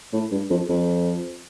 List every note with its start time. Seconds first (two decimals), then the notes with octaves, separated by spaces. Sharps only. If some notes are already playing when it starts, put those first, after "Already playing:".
0.13 A2
0.31 G2
0.50 F2
0.69 F2